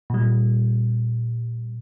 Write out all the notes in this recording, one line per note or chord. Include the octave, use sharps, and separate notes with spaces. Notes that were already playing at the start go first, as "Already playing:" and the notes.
A#2 G3